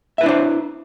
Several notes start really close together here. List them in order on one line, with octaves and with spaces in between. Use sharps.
E5 B4 E4 D4 C5